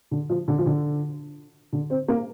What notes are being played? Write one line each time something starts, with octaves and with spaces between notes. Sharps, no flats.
D3
F3
D3
F3
D3
D3
C4
A#3